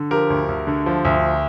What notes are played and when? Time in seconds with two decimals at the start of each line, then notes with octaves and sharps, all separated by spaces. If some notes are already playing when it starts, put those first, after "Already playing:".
Already playing: D3
0.11 F3 G4 A#4
0.30 D2
0.49 D2
0.67 D3
0.86 F3
1.05 D2